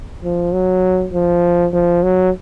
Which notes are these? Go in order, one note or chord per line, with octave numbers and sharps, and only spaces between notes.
F3
F#3
F3
F3
F#3